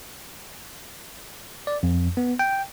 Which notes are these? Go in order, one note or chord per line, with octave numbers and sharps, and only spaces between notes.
D5
F2
B3
G5